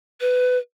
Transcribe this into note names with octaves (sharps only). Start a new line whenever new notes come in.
B4